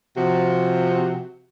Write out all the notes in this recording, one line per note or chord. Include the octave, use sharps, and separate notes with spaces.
C3 F3 F#4